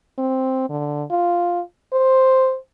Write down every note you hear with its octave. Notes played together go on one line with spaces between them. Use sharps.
C4
D3
F4
C5